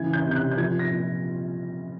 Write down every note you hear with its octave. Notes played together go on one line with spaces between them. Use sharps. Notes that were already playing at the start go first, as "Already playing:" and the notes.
Already playing: C#3 E3 G#6
G6
C3
G6
F#6
G6
F3 G#6
A#6
A#2